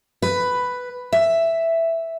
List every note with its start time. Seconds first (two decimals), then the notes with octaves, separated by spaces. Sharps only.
0.22 B4
1.13 E5